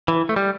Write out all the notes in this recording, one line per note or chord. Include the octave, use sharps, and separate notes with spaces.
E3
A3
G3